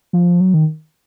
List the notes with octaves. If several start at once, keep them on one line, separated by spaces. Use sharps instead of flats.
F3
F#3
D#3